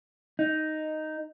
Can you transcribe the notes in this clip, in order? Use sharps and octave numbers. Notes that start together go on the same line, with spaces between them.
D#4